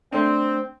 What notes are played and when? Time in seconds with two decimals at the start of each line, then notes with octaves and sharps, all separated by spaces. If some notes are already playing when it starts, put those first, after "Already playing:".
0.12 A3 C4 D4